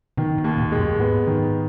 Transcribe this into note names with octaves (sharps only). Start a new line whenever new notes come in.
B2 D#3
B2
D#2
A#2
G#3
F#2
G#2 B3
D#3